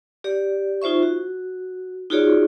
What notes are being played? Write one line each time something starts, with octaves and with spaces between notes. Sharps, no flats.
G4 D5
D#4 F4 C5 E5 C#6
F#4
D#4 F4 F#4 G#4 C#5 D5